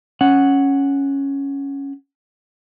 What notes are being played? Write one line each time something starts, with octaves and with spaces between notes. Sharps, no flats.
C#4 F#5